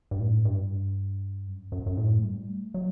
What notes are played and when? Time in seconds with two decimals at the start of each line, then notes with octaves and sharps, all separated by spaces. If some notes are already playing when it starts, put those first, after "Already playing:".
0.11 G2
0.20 A2
0.45 G2
1.47 F#2
1.72 F#2
1.86 F#2
1.97 A2
2.19 A3
2.23 G3
2.49 A3
2.74 F#3